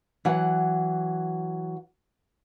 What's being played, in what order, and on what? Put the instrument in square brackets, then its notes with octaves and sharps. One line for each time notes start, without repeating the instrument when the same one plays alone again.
[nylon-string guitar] E3 F#3 F#5